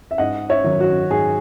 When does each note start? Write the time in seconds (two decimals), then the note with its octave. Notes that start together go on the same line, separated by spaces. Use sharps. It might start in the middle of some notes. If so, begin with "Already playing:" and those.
0.11 E5
0.18 G#2 D#5 F#5
0.49 C#5 E5
0.64 D#3 F#3
0.81 F#4
1.11 G#2 G#4